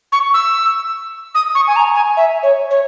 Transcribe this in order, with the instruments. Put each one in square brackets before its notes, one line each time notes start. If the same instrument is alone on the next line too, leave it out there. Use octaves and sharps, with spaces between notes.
[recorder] C#6
E6
D#6
C#6
G#5
A#5
G#5
E5
C#5
C#5